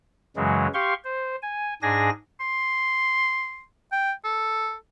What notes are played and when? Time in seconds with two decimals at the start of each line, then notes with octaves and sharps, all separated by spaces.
0.36 F#2 C#3 E3 F#3 G#3
0.74 G4 F5 C6 C#6
1.04 C5
1.42 G#5
1.82 G#2 D4 G#4 G#5 A#6
2.40 C6
3.92 G5
4.24 A4